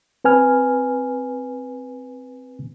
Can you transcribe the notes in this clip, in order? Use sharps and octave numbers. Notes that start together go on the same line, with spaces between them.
C4 B4 G#5 F6